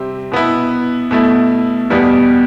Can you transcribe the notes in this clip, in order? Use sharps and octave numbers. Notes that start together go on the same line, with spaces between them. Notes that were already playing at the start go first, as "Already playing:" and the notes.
Already playing: C3 G3 C4
B2 B3 E4
B2 A3 E4
E2 B2 G3 B3